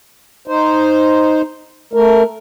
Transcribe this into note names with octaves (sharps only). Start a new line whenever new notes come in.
D#4 C5
A3 A#4